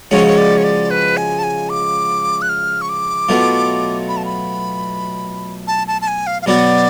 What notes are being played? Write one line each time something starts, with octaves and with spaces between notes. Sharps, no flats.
C#3 F3 G#3 C#4 F#4 C#5
C#5
D5
C#5
D5
B4
G#5
A5
G#5
D6
F#6
F6
C#6
D6
B2 F#3 A3 F4
B5
A5
B5
A5
A5
A5
G#5
F5
F5
B2 F#3 B3 F#4 D5